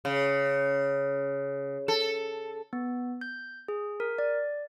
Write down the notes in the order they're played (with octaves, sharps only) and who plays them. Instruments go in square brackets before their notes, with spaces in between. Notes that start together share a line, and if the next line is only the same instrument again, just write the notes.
[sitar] C#3
A4
[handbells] B3
G6
G#4
A#4
D5